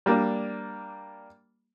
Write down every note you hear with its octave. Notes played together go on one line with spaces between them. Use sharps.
G3 A#3 D4